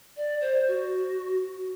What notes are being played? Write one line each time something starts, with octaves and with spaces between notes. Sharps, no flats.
D5
C5
F#4